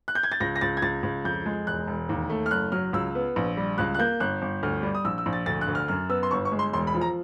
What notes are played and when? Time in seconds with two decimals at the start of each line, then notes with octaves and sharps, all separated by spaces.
0.08 F#6
0.15 G6
0.23 G#6
0.32 A6
0.40 C#2 A#6
0.56 A#6
0.61 C#2 A6
0.77 G#6
0.82 C#2 A6
1.03 C#2
1.25 F2 G6
1.46 G#3
1.67 E1 F#6
1.87 E1
2.09 D#2
2.30 A3
2.46 F6
2.51 F#1 F#6
2.72 F#3 F6
2.93 C#2 E6
3.15 B3
3.36 A#1
3.57 G3
3.78 C#2 F#6
3.95 F#6
3.99 A#3 G6
4.20 G1 F#6
4.42 G1
4.63 D2 F6
4.83 G3
4.95 D#6
5.05 A#1 E6
5.18 E6
5.26 A#1
5.33 A6
5.46 D2 A6
5.61 F#6
5.68 D2
5.75 F6
5.88 F#2 F6
6.09 B3 E6
6.23 C6
6.31 G1 C#6
6.45 C#6
6.52 G#3
6.59 C6
6.73 E1 C6
6.87 B5
6.94 F3
7.01 A#5